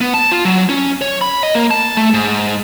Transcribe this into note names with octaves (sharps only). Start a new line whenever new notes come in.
B3
A5
F4
F#3
C#4
C#5
B5
D#5
A#3
A5
A3
G#2